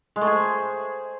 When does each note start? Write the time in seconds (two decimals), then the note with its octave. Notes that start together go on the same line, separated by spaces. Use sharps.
0.16 G#3
0.21 A3
0.27 G#4
0.33 C5